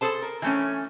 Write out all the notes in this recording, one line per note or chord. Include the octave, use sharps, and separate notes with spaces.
G#4 A4 C5 A5
A#4
E3 A3 C#4